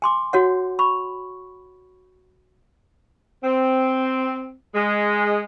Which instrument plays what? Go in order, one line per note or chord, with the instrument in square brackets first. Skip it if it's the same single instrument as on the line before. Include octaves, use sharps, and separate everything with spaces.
[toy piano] G#5 C6 D6
F#4 C#5 F#5
B5 C#6
[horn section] C4
G#3